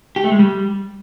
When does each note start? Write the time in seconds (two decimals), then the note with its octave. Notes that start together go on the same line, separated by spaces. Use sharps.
0.16 G4
0.24 A3
0.32 G#3
0.39 G3